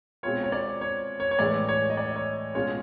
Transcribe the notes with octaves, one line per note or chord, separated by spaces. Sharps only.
B2 G#3 C4 F4 C#5
C#5
D5
C#5
C#5
C#5
A2 E3 G#3 D5
C#5
D#5
D5
C#5
B2 G#3 C#4 F4 C#5